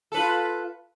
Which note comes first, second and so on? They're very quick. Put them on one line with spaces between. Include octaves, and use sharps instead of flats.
A4 B4 F4